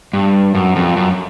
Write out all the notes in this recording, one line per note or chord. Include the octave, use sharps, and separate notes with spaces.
G2
F#2
F2
F#2